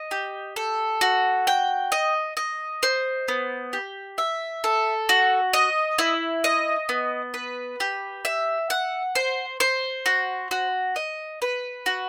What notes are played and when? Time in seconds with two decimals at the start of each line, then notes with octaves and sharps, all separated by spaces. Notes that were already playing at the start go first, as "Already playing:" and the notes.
Already playing: D#5
0.11 G4
0.56 A4
1.01 F#4
1.47 G5
1.92 D#5
2.37 D#5
2.83 C5
3.28 B3
3.73 G4
4.18 E5
4.64 A4
5.09 F#4
5.53 D#5
5.98 E4
6.44 D#5
6.89 B3
7.34 B4
7.80 G4
8.25 E5
8.70 F#5
9.15 C5
9.60 C5
10.06 F#4
10.51 F#4
10.96 D#5
11.42 B4
11.86 F#4